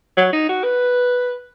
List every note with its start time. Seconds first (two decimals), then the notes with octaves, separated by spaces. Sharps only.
0.17 F#3
0.33 D#4
0.49 F#4
0.64 B4